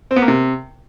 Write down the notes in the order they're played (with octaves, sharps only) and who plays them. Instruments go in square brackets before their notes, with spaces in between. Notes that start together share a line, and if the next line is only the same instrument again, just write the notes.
[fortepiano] C4
B3
A#3
C3